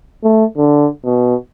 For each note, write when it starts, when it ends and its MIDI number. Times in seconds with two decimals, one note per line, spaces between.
0.24 0.45 57
0.58 0.88 50
1.05 1.35 47